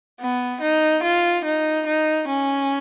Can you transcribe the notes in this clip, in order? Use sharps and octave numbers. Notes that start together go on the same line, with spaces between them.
B3
D#4
F4
D#4
D#4
C#4